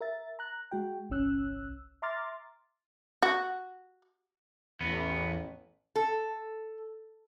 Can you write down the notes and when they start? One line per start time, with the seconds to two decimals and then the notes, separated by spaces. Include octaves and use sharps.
0.01 A#4 E5 A6
0.39 A#5 F#6
0.71 G#3 F#4 G5
1.10 G1 C2 C#4 E6 F#6
2.02 E5 A#5 C6 D6 F6 A6
3.22 F#4
4.81 A1 E2 B3
5.96 A4